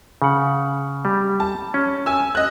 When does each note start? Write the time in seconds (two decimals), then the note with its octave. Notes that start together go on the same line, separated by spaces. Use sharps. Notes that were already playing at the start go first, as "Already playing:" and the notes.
0.22 C#3 F#5
1.05 G3
1.40 A5
1.74 C#4
2.06 G#5 E6
2.35 D#5 F#6